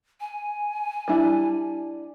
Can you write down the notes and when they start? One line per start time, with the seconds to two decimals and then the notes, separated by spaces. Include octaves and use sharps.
0.20 G#5
1.08 G3 D4 E4